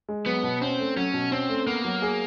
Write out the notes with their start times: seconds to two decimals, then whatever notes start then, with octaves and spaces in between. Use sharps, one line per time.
0.09 G#3
0.26 F#3 B3
0.43 B2
0.61 C4 C#4
0.79 A3
0.96 F#3 C#4
1.14 B2
1.31 C4 C#4
1.49 A3
1.67 A#3 B3
1.85 F#3
2.02 G#4